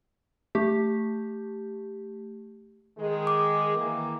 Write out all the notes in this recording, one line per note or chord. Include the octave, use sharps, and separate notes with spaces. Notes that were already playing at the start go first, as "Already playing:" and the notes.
A3 G4
D#3 G#3 G#4
D6
D#3 E3 A#3